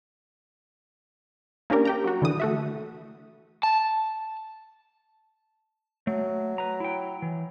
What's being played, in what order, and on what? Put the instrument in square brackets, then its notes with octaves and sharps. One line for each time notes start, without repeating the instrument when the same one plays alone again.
[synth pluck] A#3 C#4 D4 G4 A#4
G4 G5 A#5
F#3 F#4
D3 E3 D#6
A3 F#4 E5
[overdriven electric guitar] A5
[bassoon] F#3 [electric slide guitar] A3
[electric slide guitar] B4 A#5
E4 G5
E3